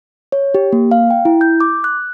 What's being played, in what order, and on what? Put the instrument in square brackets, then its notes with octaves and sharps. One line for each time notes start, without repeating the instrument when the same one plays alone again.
[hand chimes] C#5
G4
A#3
F5
G5
E4
G6
D6
F#6